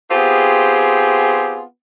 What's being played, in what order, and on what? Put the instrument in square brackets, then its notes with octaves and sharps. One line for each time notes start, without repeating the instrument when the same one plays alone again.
[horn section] B3 C4 F4 G4 G#4